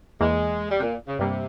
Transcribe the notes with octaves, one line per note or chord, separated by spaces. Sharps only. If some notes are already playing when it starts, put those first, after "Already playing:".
E2 E3 G#3 A#3
G3
C3
A#2
C#3
G2 C3 G3 A#3